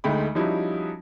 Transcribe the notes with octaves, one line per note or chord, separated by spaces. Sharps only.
D2 G#3 A3 D#4 G5 B5
F3 G3 C#4 D#4 E4 F#4